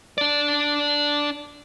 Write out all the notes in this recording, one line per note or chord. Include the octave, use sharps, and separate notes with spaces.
D4 D5